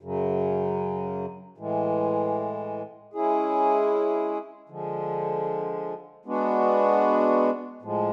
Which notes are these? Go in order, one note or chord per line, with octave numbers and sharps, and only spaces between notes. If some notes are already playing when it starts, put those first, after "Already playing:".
F#2 C#3 F#3
A2 E3 G#3
G#3 C#4 E4 G#4
D3 F3 G#3
G#3 B3 D4 F#4
A2 F3 G#3